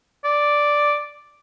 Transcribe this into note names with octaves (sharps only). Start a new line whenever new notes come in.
D5